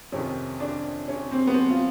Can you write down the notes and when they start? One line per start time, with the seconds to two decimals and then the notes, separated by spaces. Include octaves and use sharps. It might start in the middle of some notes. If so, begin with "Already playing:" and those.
0.12 F2 C3 D#3 C#4
0.60 D4
1.08 C#4
1.32 C4
1.47 B3
1.54 C4
1.70 F4